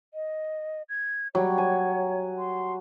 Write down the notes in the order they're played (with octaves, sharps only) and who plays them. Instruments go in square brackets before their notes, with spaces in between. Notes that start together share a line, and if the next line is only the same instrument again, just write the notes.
[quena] D#5
G#6
[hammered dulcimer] F#3 G3 [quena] C#5
[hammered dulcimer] G#5
[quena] C6